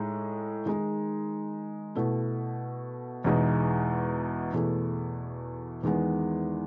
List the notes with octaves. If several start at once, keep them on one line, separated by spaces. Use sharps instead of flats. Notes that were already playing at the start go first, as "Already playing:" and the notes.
Already playing: A2 G#3 D#4
D#3 G#3 D#4
B2 A3 E4
E2 B2 G#3 D#4
E2 B2 A3 E4 G#4
E2 D#3 G#3 B3